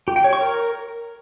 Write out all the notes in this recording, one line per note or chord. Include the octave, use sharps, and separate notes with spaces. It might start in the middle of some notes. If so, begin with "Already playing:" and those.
G4
G5
C#5
C#6
A#4